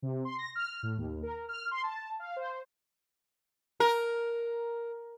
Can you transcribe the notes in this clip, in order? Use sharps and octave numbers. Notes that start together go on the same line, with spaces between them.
C3
C6
A#6
F6
A2
D#2
A#4
F6
C6
A5
F5
C5
A#4